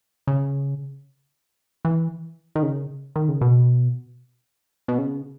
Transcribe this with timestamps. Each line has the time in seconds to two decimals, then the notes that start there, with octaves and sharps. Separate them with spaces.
0.27 C#3
1.85 E3
2.56 D#3
2.63 C#3
3.16 D#3
3.29 C#3
3.41 B2
4.88 B2
4.98 C#3